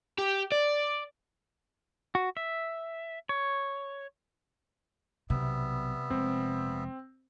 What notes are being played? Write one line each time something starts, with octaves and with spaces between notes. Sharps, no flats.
G4
D5
F#4
E5
C#5
B1 C3 G3 B3 E5
F1 G#3 C4